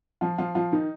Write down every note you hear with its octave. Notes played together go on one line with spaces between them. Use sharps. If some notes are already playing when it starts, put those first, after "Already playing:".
F3 F4
F3 F4
F3 F4
D#3 D#4